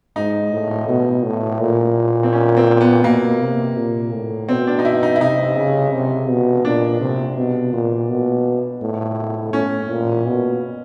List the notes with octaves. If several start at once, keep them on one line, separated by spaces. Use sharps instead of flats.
G#2 D#4
A2
B2
A2
A#2
C4
C#4
C4
B3
B2 A#3
C3
A#2
A2
B2 C4
D4
D#4
E4
D#4
E4
C3 D#4
C#3
C3
B2
A#2 D4
C3
B2
A#2
B2
A2
A2 C#4
A#2
B2